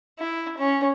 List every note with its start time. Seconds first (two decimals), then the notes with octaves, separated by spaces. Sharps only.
0.19 E4
0.58 C#4